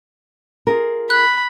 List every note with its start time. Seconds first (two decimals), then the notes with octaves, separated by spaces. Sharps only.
0.67 F4 G#4 A#4
1.10 B5 F#6